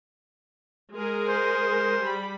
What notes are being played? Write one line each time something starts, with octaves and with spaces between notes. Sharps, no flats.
G#3 G#4 A#4
C5
G3 B5